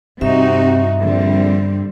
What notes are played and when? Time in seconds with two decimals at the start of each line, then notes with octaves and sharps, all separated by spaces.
0.21 G2 C3 C4 D#4 F#4 E5
1.01 A#1 D3 G3 C4